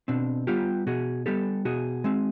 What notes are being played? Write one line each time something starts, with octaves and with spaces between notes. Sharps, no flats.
B2 C4 D4
G3 B3 F4 G4
B2 F#4 G#4
G3 B3 G4 A4
B2 F#4 G#4
G#3 C4